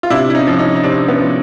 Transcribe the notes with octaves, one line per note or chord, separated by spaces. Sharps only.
F4
C3 D4 E4
E4
C#4 D#4
F3
C#4 D#4
D#4
C3 C4 D4
B3 C#4
F3